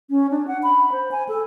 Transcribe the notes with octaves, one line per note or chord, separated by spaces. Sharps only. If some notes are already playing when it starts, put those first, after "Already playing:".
C#4
D4
F#5
B5
C5
G#5
A4